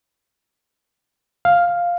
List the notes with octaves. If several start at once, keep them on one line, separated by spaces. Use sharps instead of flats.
F5